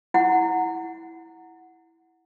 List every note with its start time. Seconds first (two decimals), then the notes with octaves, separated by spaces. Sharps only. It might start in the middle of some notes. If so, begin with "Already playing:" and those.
0.14 E4 F#5